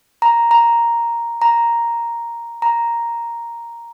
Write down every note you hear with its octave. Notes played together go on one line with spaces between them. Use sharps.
A#5
A#5
A#5
A#5